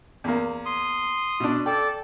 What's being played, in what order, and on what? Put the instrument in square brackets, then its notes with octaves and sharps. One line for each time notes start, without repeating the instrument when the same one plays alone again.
[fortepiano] E2 A#3
[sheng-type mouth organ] C6 D#6
[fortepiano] B2 D4
[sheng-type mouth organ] A4 D5 [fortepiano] G5